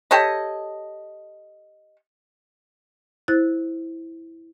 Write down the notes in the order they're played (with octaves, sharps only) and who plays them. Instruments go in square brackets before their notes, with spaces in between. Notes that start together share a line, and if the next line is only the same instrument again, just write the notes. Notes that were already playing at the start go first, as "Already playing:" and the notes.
[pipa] G4 A4 C#5 D#5
[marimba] E4 C5 F#6 A6